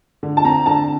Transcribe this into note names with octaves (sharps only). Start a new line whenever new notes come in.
D3
A5
C4 A#5
D3 A5